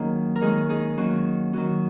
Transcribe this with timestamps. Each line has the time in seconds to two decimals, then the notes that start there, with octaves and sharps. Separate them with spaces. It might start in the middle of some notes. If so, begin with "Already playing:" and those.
Already playing: D#3 F#3 A#3 C#4 D#4 G#4 A#4
0.36 A#4
0.41 D#3 G#3 C#4 D#4 G#4
0.69 D#4 G#4
0.97 D#3 F#3 A#3 C#4 F#4
1.53 D#3 F#3 C#4 F#4